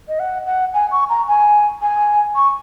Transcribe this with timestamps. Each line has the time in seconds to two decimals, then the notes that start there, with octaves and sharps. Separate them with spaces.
0.08 D#5
0.19 F#5
0.46 F#5
0.74 G#5
0.91 C#6
1.09 A#5
1.28 G#5
1.82 G#5
2.35 C#6